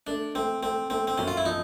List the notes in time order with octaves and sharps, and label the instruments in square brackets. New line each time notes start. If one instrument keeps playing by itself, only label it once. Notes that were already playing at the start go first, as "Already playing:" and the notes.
[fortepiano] A3 [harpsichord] D4
[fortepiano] A3 [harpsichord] C4
[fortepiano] A3 [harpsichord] C4
[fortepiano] A3 [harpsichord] C4
[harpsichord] C4
[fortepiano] F#2 [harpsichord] C#4
[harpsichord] F4
E4
[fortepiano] F3 [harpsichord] D#4